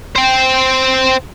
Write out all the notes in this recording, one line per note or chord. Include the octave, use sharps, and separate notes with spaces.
C5 G5